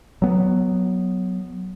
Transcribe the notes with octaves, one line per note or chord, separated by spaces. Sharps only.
F#3 B3